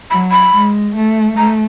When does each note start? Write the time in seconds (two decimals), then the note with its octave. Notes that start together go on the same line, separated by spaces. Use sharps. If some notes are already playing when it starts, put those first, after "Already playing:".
0.10 F#3 B5
0.32 B5
0.53 G#3
0.95 A3
1.37 A3 A#5